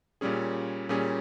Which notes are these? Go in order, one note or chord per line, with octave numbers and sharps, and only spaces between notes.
A#2 G3 C#4 G#4
A#2 G3 C#4 G#4